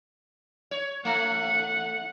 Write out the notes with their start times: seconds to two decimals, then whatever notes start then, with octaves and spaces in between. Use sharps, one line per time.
0.71 C#5
1.05 A3 F#5